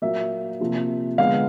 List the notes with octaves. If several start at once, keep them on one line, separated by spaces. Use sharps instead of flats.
A#2 F#3 A#3 E5
C3 F3 A#3
D3 F3 G#3 B3 F5